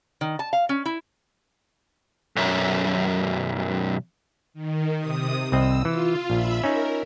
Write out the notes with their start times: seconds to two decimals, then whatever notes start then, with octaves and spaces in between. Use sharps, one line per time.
0.21 D#3
0.39 A5
0.53 F5
0.69 C#4
0.86 E4
2.36 B1 F#2
4.54 D#3
4.98 C3 D#6
5.52 C2 C4 D#5 E6
5.85 E3 F4
6.30 A#1 E5 B5 E6
6.64 C#4 D#4 A#4